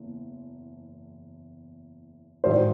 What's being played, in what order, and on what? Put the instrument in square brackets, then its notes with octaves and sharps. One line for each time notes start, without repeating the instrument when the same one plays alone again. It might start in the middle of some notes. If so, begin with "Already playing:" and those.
Already playing: [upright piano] F#1 E2
[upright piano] A1 G#2 D#3 F#3 [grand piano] C5 D5